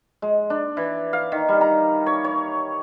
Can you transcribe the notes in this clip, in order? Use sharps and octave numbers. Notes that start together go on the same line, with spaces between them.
G#3
D4
E3
F5
D#3
G3
A#5
C#5
C#5